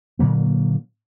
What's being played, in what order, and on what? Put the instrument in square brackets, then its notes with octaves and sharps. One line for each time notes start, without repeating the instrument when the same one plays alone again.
[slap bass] A#2 D3 F#3 A#3